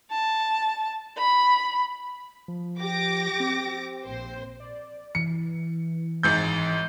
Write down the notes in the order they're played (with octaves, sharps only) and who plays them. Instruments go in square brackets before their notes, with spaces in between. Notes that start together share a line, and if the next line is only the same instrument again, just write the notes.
[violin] A5
B5
[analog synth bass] F3
[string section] G4 D6 A#6
[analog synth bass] C4
[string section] A#1 C5
[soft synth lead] D5
[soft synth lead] E3 [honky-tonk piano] C#7
[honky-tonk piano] G#1 G#2 G6